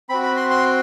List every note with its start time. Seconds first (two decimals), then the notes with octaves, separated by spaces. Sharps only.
0.09 C4 F#4 B5
0.23 B5
0.37 C6
0.50 C6